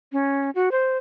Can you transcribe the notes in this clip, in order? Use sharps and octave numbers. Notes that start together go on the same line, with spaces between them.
C#4
F#4
C5